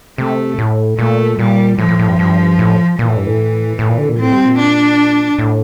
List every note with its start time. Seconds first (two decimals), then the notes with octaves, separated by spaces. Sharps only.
0.18 C3 A3
0.58 A2
0.98 A#2 A3
1.39 A#2 G3
1.78 A2 F3
1.89 A2
1.99 A2
2.08 G2
2.19 G2
2.59 A2
2.99 A#2 E3
3.08 A2
3.17 G2
3.27 A2
3.79 A2
3.89 A#2
3.98 D3
4.09 A#2
4.18 A2 C4
4.33 G3
4.46 A#2
4.58 D4
5.39 A2